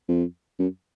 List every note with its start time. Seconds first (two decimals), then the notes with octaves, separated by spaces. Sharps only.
0.09 F2
0.59 F#2